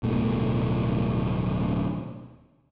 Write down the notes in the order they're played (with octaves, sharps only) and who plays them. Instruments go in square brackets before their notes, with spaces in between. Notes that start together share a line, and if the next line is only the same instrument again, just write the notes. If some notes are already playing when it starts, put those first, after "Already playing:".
[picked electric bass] D1 B2 A3